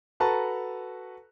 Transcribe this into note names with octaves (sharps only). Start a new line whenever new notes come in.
F#4 A4 B4 A5 A#5 C#6